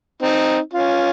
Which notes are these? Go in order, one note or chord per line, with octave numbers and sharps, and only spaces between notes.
C4 D#4
C#4 F4